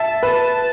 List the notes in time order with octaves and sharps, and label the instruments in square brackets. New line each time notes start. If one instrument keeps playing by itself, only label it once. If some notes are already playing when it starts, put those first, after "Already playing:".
Already playing: [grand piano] E5 [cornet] A5
[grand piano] B4